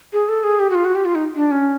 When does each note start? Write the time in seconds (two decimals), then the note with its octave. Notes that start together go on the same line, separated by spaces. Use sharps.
0.13 G#4
0.29 A4
0.44 G#4
0.60 G4
0.70 F#4
0.75 F4
0.85 F#4
0.95 G4
1.05 F4
1.15 D#4
1.36 D4
1.51 C#4